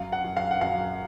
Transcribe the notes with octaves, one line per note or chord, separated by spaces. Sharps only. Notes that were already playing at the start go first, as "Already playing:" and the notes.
Already playing: F#2 F5
F#5
F#2
F5
F#5
F#2 F5